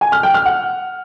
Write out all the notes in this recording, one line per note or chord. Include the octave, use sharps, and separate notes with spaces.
G#5
F6
G5
F6
F#5